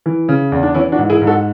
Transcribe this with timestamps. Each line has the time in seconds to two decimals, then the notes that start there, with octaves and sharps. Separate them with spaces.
0.06 E3
0.29 C#3
0.52 E2
0.63 D4
0.74 E3 C#4 E4
0.92 D4 F#4
0.98 G#2
1.10 E4 G#4
1.22 G#2
1.27 F#4 A4